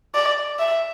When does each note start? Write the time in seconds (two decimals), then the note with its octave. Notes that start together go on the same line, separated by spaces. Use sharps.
0.15 D5
0.59 E5